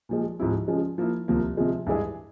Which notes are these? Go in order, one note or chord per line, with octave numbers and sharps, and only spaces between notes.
A#2 F3 G#3
G#2 F3 C4 E4 G4
C#3 F3 G#3
F3 A#3 E4
C2 C3 F3 A#3
C3 F3 G#3
G2 E3 G#3 E4 G#4